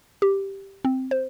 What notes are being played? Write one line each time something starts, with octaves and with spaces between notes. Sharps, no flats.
G4
C4
C5